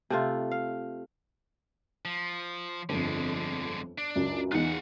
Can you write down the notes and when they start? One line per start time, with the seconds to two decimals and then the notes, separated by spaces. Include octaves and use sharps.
0.10 C3 A3 F4
0.51 F5
2.05 F3
2.89 G1 F2 D3 G#3
3.98 D4
4.16 C#2 F#2
4.51 E2 D#4 F4 F#5 F#6